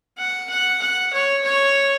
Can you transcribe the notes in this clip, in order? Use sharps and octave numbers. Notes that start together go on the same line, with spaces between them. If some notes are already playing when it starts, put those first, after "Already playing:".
F#5
F#5
F#5
C#5
C#5